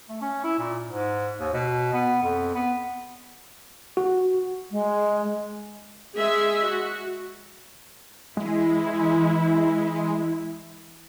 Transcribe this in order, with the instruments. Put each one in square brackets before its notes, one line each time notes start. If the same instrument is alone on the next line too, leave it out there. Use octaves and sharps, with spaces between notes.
[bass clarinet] A3
C#4
E4
A#2
G#2
D#2
B2
B3
F2
B3
[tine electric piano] F#4
[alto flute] G#3
[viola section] G#3 G#4 E5
F#4
[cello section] E3 E4 [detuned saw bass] G#3